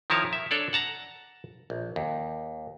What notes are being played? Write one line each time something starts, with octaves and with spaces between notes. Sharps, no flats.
D#3 F3 E4 A#4 C#5 A5
E5
D4 A4 C#5 D5
F#5 A5 A#5
A#1
D#2